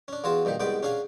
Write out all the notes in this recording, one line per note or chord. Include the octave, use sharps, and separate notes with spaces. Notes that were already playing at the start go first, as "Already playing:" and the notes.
C#4 D4
E2 F4 F#4 G#4 A5
G2 A#2 D#3 G4
C2 G#2 B3 D5 G5 D6
C#4 D4 G#4 F5 G#5